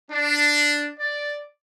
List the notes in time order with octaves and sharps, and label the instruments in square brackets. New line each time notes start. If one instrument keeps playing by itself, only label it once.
[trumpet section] D4
D5